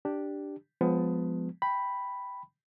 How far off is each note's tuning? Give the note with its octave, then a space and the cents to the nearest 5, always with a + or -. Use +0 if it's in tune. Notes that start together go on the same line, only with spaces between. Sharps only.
D4 +0 G4 +0
F3 +15 G#3 +0 B3 +25
G5 +0 B5 +0